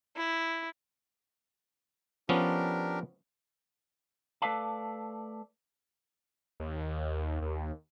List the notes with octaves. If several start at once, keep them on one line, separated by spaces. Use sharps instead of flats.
E4
F3 B3 C#4 D4 G4 A#4
A3 A4 B4 D5 F5 A5
D#2
D#2